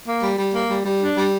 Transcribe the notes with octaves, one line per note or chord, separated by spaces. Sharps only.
A#3
G3
G3
A#3
G3
G3
D4
G3